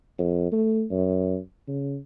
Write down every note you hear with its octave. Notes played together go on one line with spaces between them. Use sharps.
F2
A3
F#2
C#3